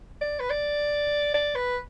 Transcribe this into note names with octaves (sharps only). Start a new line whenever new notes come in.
D5
B4
D5
D5
B4